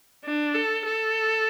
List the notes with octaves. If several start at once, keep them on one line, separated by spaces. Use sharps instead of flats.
D4
A4
A4